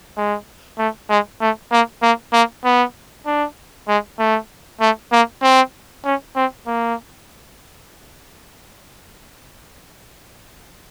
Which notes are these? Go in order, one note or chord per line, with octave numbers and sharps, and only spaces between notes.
G#3
A3
G#3
A3
A#3
A#3
A#3
B3
D4
G#3
A3
A3
A#3
C4
C#4
C4
A#3